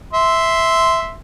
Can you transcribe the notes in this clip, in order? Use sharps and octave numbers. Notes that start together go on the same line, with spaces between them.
E5 C6